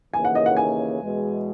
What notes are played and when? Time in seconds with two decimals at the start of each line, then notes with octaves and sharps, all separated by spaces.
0.13 D#2 C#3 E3 A#3 D#4 G#5
0.25 F#5
0.35 D#5
0.46 F#5
0.57 G#5
1.01 E2 B2 G#3